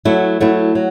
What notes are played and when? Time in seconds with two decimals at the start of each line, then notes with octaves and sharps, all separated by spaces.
0.05 F#3 A3 E4
0.41 F#3 A3 E4
0.75 F#3